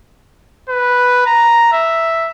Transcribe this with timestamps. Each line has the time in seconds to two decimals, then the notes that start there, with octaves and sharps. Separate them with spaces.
0.69 B4
1.27 A#5
1.73 E5